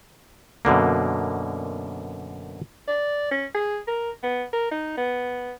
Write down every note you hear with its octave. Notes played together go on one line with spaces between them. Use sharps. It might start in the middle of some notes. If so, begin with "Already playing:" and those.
F#2 B2 D3 A#3
D5
C#4
G#4
A#4
B3
A#4
D#4
B3